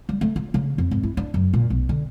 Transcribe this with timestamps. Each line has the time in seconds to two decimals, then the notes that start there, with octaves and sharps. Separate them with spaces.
0.09 G3
0.21 A3
0.36 F4
0.54 C#3
0.78 F2
0.91 G#1
1.03 E4
1.17 D4
1.34 F#2
1.53 A#2
1.70 B1
1.89 D3